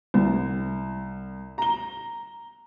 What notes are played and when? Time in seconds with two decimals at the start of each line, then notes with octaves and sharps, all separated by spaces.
0.14 C2
1.58 A#5 G7